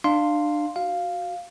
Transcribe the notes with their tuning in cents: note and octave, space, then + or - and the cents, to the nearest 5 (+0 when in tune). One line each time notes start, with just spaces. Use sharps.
D4 +30 F5 +0 C6 +0
F#4 +0 F5 +0